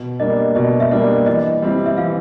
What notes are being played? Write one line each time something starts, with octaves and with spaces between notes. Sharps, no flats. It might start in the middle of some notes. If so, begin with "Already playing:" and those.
Already playing: B2
G3 A#3 D4 D#5
B2 D#5
E5
G3 A#3 D4 D#5
E3 D#5
G3 C4 E4
E5
E3 F5